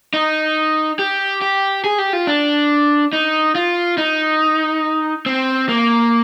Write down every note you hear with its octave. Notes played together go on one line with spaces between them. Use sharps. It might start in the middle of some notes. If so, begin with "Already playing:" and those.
D#4
G4
G4
G#4
G4
F4
D4
D#4
F4
D#4
C4
A#3